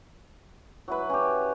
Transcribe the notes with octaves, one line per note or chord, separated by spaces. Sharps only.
F#3 E4 B4
C#4 G4